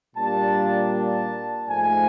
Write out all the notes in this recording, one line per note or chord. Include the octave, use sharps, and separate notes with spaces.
A#2 G3 A#3 D4 A5
A5
G#2 F3 A3 G#5